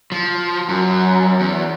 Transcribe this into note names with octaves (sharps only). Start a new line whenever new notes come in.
F3
F#2
E2